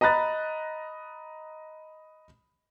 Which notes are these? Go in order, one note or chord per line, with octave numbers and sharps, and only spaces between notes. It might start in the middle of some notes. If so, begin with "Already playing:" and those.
D#5 A#5 B5 F#6 A6